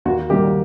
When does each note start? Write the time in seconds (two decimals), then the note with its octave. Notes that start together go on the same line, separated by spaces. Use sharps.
0.05 D#2 F#4
0.30 D#3 G3 A#3 G4